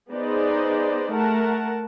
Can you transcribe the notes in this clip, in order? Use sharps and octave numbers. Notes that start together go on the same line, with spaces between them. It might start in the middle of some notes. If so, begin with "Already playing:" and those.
B3 D#4 G#4 C5 D5 D#5
A3 A#4 F#5 A5